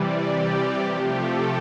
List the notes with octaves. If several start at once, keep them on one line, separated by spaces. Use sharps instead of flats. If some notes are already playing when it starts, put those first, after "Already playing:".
Already playing: C3 E3 G3 D5
G4
C3 F3 A3 G4
A4